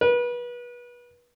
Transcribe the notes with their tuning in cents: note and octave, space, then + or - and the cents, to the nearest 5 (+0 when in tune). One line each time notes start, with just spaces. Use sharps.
B4 -30